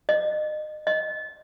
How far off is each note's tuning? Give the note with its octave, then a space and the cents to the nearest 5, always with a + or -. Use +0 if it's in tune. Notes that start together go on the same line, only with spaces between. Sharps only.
D#5 -30
D#5 +0